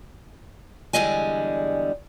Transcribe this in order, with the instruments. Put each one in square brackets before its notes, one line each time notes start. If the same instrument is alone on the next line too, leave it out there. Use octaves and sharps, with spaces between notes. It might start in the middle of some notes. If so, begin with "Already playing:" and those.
[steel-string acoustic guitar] E2 D3 G3 G#3 D#5 G#5